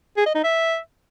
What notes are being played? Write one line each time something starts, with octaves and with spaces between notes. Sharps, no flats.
G#4
D#5
D#4
E5